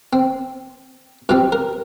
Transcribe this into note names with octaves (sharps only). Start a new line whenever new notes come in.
C4
G2 G3 C4 F4
A#4